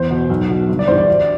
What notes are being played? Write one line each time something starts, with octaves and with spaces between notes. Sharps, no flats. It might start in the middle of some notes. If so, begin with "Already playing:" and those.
Already playing: E2 C5
B2
B1
B2
G1
D5
G2 E3 C5
D5
D2